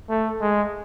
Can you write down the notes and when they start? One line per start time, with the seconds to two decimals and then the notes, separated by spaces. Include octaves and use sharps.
0.10 A3
0.41 G#3